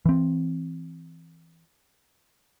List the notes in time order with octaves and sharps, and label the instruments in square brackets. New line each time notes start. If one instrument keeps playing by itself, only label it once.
[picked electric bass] E3 C4